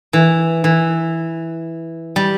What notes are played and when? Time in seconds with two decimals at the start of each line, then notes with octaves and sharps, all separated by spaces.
0.13 E3
0.64 E3
2.16 G3